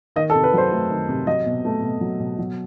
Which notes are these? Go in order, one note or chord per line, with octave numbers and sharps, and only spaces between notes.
D#3 D#5
A4
C3
B4
F#3 C5
A3
D#3
C3
F#3 D#5
B2
A3
B2
F#3
B2
F#3